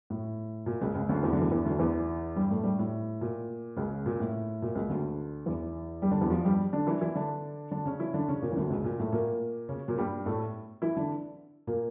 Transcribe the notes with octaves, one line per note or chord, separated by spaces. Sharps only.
A2
A#2
C#2 C#3
C#2 C#3
D2 D3
E2 E3
D2 D3
E2 E3
E2 E3
D2 D3
E2 E3
G2 G3
A2 A3
G2 G3
A2
A#2
C#2 C#3
A#2
A2
A#2
C#2 C#3
D2 D3
E2 E3
G2 G3
D3 D4
E2 E3
F2 F3
G2 G3
D3 D4
E3 E4
E3 E4
D3 D4
D3 D4
C#3 C#4
E3 E4
D3 D4
C#3 C#4
A#2 A#3
E3
D2 D3
C#2 C#3
A#2
A2 A3
A#2 A#3
C#3 C#4
A#2 A#3
G2 G3
A2 A3
E3 E4
D3 D4
A#2 A#3